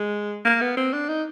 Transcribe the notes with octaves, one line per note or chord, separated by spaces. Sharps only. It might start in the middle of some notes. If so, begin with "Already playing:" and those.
Already playing: G#3
A#3
B3
C4
D4
D#4